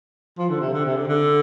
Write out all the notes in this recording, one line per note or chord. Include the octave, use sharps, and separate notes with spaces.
F3
D3
C3
D3
C3
D3
D3